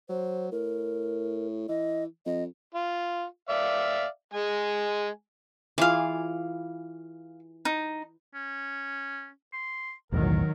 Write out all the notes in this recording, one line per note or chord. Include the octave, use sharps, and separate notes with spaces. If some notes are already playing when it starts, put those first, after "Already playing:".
F#3 C5
A2 A#4
E3 D#5
F2 D#5
F4
D5 E5 F5
G#3 G#5
E3 F4 G#4 F5 D6
D#4
C#4
C6
B1 E2 A2 D#3 F#3 A#4